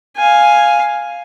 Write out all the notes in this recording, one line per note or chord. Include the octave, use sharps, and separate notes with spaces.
F5 G#5